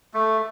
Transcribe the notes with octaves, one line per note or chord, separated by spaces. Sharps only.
A3